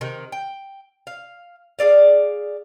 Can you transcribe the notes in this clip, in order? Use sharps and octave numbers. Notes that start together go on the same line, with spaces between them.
C3 D#3
G5
F5
G#4 A4 D5 F5